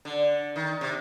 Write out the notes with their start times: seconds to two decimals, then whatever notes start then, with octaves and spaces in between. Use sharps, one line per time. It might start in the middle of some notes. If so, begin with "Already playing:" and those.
0.05 D3
0.56 D#3
0.81 C3